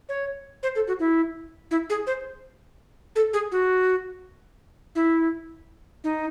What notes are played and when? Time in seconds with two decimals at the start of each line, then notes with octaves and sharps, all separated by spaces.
0.09 C#5
0.63 C5
0.75 A4
0.88 F#4
0.99 E4
1.71 E4
1.90 G#4
2.07 C5
3.16 A4
3.33 G#4
3.52 F#4
4.95 E4
6.04 D#4